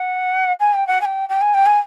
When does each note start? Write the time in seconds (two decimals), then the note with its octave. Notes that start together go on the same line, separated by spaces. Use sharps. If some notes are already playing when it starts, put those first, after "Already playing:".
Already playing: F#5
0.60 G#5
0.74 G5
0.87 F#5
1.01 G#5
1.05 G5
1.29 G5
1.41 G#5
1.54 G5
1.65 G#5